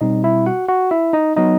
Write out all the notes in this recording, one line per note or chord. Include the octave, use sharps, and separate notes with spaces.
B2 G3 C4 D#4 D#5
E4 E5
F#4 F#5
F#4 F#5
E4 E5
D#4 D#5
F#3 B3 D#4 D#5